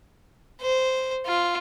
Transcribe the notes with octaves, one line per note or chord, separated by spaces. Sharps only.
C5
F4